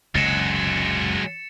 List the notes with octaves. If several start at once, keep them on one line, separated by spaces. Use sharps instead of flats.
F#1 C#2 C3 F#3 G#3 A6 C#7 E7